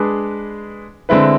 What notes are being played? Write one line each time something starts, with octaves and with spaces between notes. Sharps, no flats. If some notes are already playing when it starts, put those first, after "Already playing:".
Already playing: G#3 D4 G#4 B4
D3 G#3 C4 E4 B4